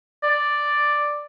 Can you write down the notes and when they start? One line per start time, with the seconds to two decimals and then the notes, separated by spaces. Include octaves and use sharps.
0.23 D5